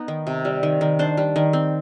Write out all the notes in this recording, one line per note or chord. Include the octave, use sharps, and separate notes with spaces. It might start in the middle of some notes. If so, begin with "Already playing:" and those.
Already playing: B3 D#4
D#3
C3
G3
D#3
D#3
D4 C5
G3
D#3
C4